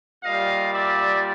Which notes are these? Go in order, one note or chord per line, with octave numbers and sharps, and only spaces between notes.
A#2 G3 D#5 F5
D5 E5